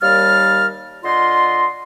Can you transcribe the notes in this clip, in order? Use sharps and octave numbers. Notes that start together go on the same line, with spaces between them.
D#2 G3 A#4 F5 A5 F6
D3 F4 D#5 C6